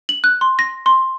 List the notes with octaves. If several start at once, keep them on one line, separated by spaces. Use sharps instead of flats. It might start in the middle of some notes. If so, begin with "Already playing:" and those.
F#7
F#6
C6
A#6
C6